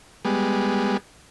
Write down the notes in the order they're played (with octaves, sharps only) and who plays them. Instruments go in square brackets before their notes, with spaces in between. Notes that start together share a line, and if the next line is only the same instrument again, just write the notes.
[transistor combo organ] G3 G#3 B3